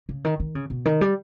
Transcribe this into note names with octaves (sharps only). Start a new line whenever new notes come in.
C#3
D#3
D#3
C#3
B2
D#3
G3